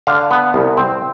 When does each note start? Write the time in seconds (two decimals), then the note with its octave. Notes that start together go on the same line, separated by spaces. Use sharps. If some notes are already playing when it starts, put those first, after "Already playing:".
0.07 D3 F5
0.31 B3
0.54 C2
0.77 C4